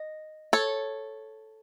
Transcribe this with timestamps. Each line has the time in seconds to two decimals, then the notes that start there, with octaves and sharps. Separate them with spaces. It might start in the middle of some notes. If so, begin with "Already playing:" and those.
Already playing: D#5
0.53 A4 C#5